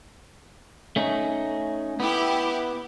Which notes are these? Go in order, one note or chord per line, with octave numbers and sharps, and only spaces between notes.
A3 C#4 D#4
B3 E4 G4